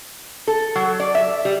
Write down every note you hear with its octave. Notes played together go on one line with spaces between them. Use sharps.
A4
F#3
D5
E5
G3